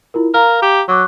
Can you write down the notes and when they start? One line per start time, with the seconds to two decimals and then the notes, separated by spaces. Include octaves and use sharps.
0.14 E4 F4 A#4
0.34 A#4 F5 A#5
0.62 G4
0.88 F#3 C#6 D6 F#6